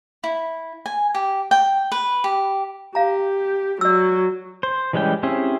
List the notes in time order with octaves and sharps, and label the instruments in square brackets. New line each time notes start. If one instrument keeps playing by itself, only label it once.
[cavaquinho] E4
G#5
G4
G5
B4
G4
[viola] G4 [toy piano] F5 A#5
[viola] F#3 [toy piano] D5 E6
[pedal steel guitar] C5
E3 G3 G#3 C#4 G5
C4 C#4 E4 G4 G#4